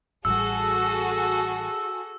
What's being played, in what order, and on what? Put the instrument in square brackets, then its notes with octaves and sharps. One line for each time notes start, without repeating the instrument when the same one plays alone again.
[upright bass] A1 G3 [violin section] F#4 G#4 A4 [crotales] E6